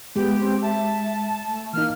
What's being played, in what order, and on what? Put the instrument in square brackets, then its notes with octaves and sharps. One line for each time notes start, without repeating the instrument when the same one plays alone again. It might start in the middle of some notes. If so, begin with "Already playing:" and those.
[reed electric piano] G#3 [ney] B3 [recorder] G4
[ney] C4
[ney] E5 [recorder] A5
[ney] A3
[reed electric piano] E3 D#4 [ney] A#3 [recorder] F6